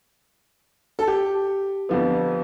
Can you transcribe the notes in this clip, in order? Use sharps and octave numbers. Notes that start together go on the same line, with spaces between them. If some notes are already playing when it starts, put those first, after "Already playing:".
A4
G4
F2 D3 F3 B3